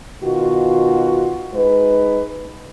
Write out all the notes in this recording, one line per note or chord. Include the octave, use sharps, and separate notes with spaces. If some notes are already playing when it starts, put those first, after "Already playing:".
B2 D#3 F4 F#4
G#3 D#4 B4